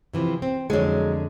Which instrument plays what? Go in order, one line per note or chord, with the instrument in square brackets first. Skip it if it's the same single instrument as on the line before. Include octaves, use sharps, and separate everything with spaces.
[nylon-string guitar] C3 E3 F3
C4
[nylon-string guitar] F2 G#2 D3 [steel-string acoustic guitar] F#3 G#3